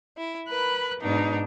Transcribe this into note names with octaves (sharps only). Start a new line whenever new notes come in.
E4
A#4 B4 B5 F#6
G#2 B2 D4 D#4